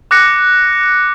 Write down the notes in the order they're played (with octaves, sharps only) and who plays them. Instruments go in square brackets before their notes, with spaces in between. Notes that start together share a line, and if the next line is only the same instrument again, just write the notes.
[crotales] D6 F#6 A#6 C#7